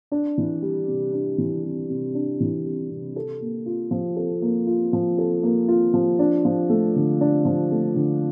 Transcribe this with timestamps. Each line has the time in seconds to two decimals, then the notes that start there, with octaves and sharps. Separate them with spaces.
0.12 D4
0.38 E3
0.62 G3
0.88 C3
1.13 D4
1.38 E3
1.63 G3
1.90 C3
2.15 D4
2.40 E3
2.65 G3
2.90 C3
3.16 A4
3.41 A#3
3.66 F4
3.91 F3
4.16 A4
4.42 A#3
4.67 F4
4.93 F3
5.18 A4
5.43 A#3
5.68 F4
5.94 F3
6.19 D4
6.45 F3
6.69 A3
6.96 D3
7.21 D4
7.45 F3
7.71 A3
7.96 D3